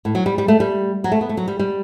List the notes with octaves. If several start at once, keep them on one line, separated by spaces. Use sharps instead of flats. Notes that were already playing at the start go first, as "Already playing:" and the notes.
A2
F#3
G3
G3
A3
G3
F#3
A3
B3
A3
F#3
G3
G3